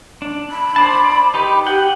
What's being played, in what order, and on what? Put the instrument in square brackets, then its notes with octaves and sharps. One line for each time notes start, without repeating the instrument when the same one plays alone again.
[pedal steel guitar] D4
[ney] B5
[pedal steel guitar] C5 D5 A5
D5
D#4 G4 B4
[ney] G4 [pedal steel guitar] F#5 G5